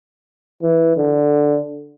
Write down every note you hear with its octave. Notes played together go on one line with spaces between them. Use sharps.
E3
D3